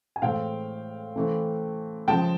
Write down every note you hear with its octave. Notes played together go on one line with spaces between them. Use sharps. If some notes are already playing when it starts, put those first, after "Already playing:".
G#5
A2 E3 G#3 C4 F5 G5
E3 A3 C4
C#3 F3 G#3 G5 A5